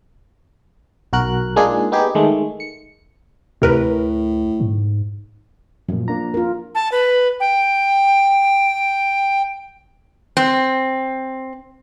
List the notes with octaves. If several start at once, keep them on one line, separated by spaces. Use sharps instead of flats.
B1 F#4 A#4 F#6
G#3 A#3 D4 D#4 F4 G#4
B3 D#4 G4 G#4
D#3 G#3 A3
C#7
D2 A2 C3 A#4 B4
G#2
F#2 A#2 F3
A#3 D4 A#5
F4 A#4
A5
B4
G5
C4